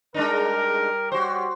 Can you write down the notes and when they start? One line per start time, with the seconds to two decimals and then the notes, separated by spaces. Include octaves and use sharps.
0.14 G3 G#3 D4 D#4 A#4
1.12 G3 F#4 G4 C5 C#5